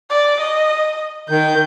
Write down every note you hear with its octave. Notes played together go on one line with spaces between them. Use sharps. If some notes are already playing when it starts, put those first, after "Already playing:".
D5
D#5
D#3 G6